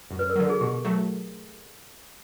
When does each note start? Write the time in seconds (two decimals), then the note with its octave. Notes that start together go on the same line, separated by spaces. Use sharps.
0.11 F#2
0.19 B4
0.30 A#4
0.35 D3 F#3 A4
0.50 G#4
0.60 B2 G4
0.85 F#3 A3